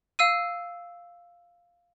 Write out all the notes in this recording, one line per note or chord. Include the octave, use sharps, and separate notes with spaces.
F5 E6 D#7